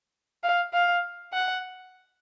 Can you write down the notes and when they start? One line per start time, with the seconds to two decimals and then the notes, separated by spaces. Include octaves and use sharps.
0.43 F5
0.73 F5
1.33 F#5